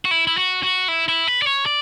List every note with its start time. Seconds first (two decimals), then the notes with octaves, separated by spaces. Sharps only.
0.05 F#4
0.11 E4
0.27 E4
0.38 F#4
0.63 F#4
0.88 E4
1.08 E4
1.28 B4
1.42 D5
1.47 C#5
1.66 D5